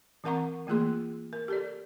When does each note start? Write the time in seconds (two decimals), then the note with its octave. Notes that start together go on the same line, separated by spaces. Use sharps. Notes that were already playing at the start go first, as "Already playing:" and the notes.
0.24 E3 C4 A#4 F#5 A#5 C#6
0.67 E3 A3 A#3 F4 G#4 C6
1.33 A#4
1.48 G4 A4 D5